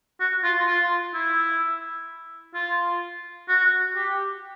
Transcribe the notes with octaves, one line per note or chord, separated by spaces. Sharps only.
F#4
F4
F4
E4
F4
F#4
G4